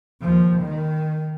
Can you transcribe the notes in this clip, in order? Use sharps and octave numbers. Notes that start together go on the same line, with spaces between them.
D#2 F3
D#3